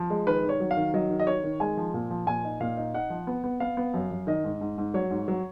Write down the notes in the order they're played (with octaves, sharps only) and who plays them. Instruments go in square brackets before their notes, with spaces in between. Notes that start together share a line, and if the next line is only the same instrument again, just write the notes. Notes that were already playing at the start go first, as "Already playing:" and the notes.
Already playing: [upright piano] F3
G#3
D#3 B4
D#3
C#5
F#3
F5
D#3
F#3 D#5
D#3
D#5
D#3 C#5
D#3
G#3 G#5
F3
A#2
F3
A#2 G#5
D#4
A#2 F5
D#4
D#4 F#5
F3
B3
B3
B3 F5
B3
F#2
F#2
D#3 D#5
G#2
G#2
G#2
F#3 C#5
G#2
F#3